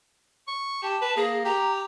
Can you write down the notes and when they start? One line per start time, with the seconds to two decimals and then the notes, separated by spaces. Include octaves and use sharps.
0.48 C#6
0.83 G4 A5
1.01 B4 A5
1.17 A#3 G#4
1.45 G4 A#5